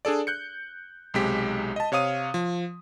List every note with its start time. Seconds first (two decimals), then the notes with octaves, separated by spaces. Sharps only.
0.05 D4 G#4 A4 D5
0.27 F#6 G6 C#7
1.14 B1 C3 G#3 G4 B6
1.76 D#5 A5
1.92 C3 C#5 F5 D#6 D#7
2.34 F3